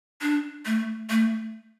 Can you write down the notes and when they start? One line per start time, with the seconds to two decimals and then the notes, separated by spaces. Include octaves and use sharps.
0.22 D4
0.66 A3
1.10 A3